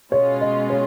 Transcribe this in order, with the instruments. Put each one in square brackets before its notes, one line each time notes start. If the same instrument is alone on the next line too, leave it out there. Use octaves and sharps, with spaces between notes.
[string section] B2 G#3 C#4 F4 [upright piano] C#5
[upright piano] D#5
C#5